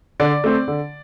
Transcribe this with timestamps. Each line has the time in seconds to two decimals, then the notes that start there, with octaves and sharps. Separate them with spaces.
0.20 D3 D5
0.44 A3 C4
0.68 D3